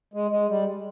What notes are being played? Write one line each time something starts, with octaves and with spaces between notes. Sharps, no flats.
G#3
G#3
G3